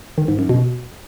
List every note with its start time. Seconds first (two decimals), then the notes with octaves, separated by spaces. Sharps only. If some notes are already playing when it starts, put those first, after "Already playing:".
0.18 D#3
0.28 G#2
0.39 F#2
0.49 B2